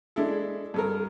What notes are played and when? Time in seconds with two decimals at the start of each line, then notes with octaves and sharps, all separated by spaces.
0.16 G#3 D4 E4 A4
0.74 G2 A4 A#4